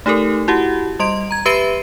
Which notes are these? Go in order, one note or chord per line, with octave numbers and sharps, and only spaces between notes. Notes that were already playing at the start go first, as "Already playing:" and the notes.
A3 D#4 G4 A4 A#4
E4 F#4 G4 F#5
G3 D#5 C6 D7
A#5 G#6
G4 B4 E5 B5 C7 D#7